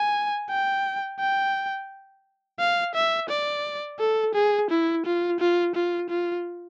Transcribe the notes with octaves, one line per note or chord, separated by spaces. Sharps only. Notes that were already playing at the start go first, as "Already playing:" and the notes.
Already playing: G#5
G5
G5
F5
E5
D5
A4
G#4
E4
F4
F4
F4
F4